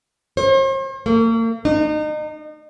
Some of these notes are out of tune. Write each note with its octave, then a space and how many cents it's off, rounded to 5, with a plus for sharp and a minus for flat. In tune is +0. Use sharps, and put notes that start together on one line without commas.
C5 +45
A#3 -40
D#4 -35